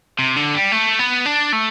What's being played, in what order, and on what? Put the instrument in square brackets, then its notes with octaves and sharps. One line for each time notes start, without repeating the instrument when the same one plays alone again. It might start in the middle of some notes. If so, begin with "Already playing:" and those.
[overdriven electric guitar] C3
D3
G3
A3
B3
D4
A3